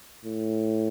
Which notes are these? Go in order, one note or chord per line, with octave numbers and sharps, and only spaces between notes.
A2